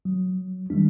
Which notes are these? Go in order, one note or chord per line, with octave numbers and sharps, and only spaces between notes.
F#3
D#3 G3 G#3 D4